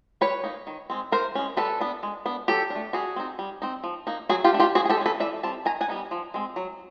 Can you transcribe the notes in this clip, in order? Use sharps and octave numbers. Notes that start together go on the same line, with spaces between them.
G3 B4 C#5
A#3 D#4
D#3
G#3 C4
E3 A#4 C5
G#3 C#4
G3 A4 B4
B3 D4
G#3
B3 D4
F#3 G4 A4
D4
A3
G3 F#4 G#4
C4 D#4
G3
C4 D#4
F3
A#3 D#4
F#3 F#4 G#4
F4 G4
A3 D4
F4 G4
F3 F#4 G#4
G#4
G4 A4
G#3 C#4
A4 B4
E3 D5 E5
G3 C4 A5
D#3 G#5 A#5
F#5 G#5
G3 B3 D#4
F3
G#3 C4
F#3